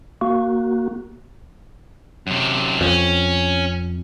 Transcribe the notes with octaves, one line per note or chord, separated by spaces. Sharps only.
A#3 F#4
F#2 C3
F2 C#4